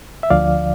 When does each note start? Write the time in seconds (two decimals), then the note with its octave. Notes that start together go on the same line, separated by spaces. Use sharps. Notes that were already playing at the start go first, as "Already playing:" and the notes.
0.23 E5
0.30 D2 D3 F3 D5 F5